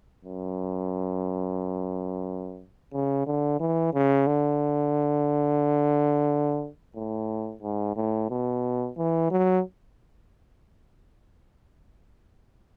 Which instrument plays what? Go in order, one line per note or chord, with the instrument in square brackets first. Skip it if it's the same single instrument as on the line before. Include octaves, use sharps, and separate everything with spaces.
[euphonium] F#2
C#3
D3
E3
C#3
D3
A2
G#2
A2
B2
E3
F#3